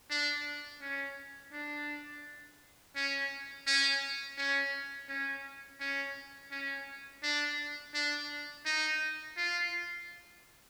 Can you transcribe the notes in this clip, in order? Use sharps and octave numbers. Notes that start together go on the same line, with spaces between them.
D4
C#4
D4
C#4
C#4
C#4
C#4
C#4
C#4
D4
D4
D#4
F4